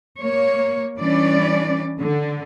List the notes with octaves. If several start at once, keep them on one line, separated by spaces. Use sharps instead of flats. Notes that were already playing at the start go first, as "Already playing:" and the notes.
A#3 C#5
E3 G3 C#4 D4 D5
D3